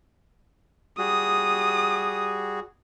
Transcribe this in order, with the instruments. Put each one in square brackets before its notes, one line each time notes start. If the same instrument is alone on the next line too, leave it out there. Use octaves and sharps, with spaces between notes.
[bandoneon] G3 F#4 G#4 [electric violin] D#6